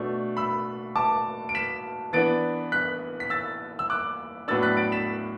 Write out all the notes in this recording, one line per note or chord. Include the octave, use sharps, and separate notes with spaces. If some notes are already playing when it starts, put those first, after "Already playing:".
Already playing: B2 A3 D4
B5 E6
A5 D6
D7
B6 E7
E3 B3 D4 A6 D7
F#6 B6
B6
E6 A6
E6
D6 F#6
A2 F#3 B3 D4 E6 A6
F#6 B6
A6 D7
B6 E7